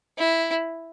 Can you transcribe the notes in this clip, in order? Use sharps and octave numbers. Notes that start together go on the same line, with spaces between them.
E4